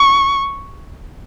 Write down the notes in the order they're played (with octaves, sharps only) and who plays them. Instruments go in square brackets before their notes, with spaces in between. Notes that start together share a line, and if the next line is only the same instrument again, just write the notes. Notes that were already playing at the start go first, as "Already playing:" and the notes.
Already playing: [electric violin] C#6